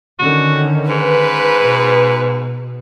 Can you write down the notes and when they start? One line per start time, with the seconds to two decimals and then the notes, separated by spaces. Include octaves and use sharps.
0.19 D3 D#3 C#4 F#4
0.89 G#2 B4
1.61 B2